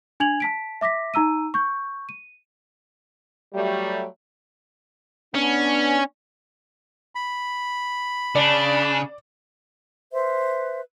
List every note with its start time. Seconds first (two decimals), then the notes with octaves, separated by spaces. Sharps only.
0.20 D4 G#5 G#6 F7 F#7
0.40 A5 B6 D7
0.81 E5 D6 A#6 B6
1.14 D#4 A#5 E6 D#7
1.54 C#6 G6
2.09 D#7
3.54 F#3 G3 A3
5.35 B3 C#4 D4
7.15 B5
8.35 C#3 D4 D5
10.11 B4 C5 E5